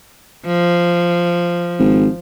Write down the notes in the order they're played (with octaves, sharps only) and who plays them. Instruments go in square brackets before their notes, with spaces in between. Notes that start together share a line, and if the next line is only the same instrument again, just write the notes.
[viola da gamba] F3
[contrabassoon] G#1